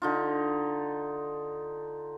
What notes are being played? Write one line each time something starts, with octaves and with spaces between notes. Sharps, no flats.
D3 D#4 F4